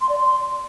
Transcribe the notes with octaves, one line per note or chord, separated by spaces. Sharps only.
C6
D5
C6